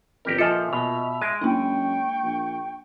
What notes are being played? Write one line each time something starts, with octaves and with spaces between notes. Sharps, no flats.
G1 F2 G4 A#4
A#2 F3 F4 A4 D#5 E5 G#5
B2 F7
G#3 D7 D#7
F#2 A#3 D4 G5 C#6
A#1